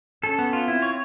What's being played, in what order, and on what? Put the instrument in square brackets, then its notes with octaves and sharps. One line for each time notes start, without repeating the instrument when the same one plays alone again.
[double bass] C#4 [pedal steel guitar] A4
[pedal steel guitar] B3
F4
[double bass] C4 [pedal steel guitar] E4
[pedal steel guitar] C#5